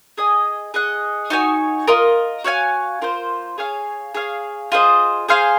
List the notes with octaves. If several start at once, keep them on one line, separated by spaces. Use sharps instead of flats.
G#4 D#5 G#5
G#4 D#5 F#5
D#4 F#4 C#5 G#5
F4 A#4 D#5
F#4 C#5 F5 G#5
A#3 F4 C5
G#4 C#5 F5 G#5
G#4 C#5 F5
F4 G#4 C5 D#5
G#4 C5 F5 G#5